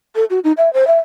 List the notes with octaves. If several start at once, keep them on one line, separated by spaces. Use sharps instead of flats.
A4
F#4
D#4
E5
C5
E5